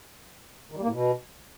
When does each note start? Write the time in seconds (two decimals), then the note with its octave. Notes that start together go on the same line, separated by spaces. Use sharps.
0.72 D#3
0.77 G3
0.82 A#3
0.88 A2
0.93 B2